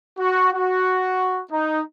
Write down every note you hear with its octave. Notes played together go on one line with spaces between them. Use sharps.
F#4
F#4
D#4